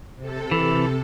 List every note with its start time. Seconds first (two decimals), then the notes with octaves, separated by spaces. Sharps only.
0.17 C3 A4
0.51 E3